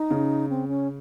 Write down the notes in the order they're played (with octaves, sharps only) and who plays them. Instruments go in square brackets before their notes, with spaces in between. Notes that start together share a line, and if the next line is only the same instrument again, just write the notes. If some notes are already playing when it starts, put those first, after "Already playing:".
Already playing: [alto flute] D#4
[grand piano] C#3
[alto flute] C4
C#4